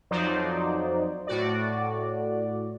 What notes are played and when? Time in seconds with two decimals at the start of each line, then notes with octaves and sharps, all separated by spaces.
0.11 F2 F3 F#3 D#4 C5 D5
1.27 A2 F#4 D5